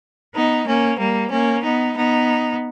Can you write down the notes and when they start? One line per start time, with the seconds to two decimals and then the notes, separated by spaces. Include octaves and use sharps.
0.34 B3 D#4
0.67 A#3 C#4
0.99 G3 A#3
1.32 A#3 C#4
1.64 B3 D#4
1.97 B3 D#4